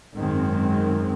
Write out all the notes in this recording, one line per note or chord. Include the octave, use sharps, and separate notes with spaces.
G#1 F#2 D#3 G#3 C4